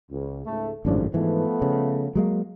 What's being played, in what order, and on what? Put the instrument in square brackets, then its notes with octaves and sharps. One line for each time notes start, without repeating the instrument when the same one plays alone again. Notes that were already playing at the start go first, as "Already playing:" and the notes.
[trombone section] C#2
C#2 G#2 A3
[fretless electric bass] G#1 F#2 A2 [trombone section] C#3 F3 D4
[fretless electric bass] G#2 E3 [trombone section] F3 A3 B3
[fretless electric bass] C#3
F#3 G#3 A#3